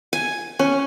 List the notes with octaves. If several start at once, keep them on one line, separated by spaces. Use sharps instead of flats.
G#5
C#4